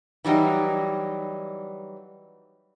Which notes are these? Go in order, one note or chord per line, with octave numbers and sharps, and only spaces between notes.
E3 F#3 G3 D#4